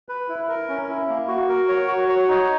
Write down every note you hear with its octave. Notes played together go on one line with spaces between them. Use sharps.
B4
E4
A#4
C#4
E4
A#3
F#4
A#4
C#5
F#4
C#5
D#4